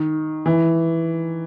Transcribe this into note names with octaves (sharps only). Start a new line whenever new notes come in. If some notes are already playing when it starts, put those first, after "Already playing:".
Already playing: D#3
E3